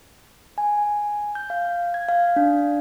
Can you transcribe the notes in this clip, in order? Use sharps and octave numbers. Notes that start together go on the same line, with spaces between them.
G#5
G6
F5
G#6
F5
D4